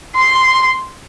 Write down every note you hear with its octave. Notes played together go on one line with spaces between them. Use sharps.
C6